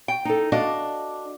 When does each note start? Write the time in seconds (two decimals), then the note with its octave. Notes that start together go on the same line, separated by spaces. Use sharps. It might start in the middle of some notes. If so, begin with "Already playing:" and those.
0.08 G5
0.25 D#4 A4
0.52 D4 F#4 D#5 F5